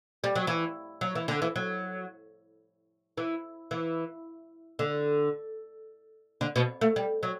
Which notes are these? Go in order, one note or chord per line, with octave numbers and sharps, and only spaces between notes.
G3
F#3
E3
F#3
E3
D3
E3
F#3
E3
E3
D3
D3
B2
A3
G3
F#3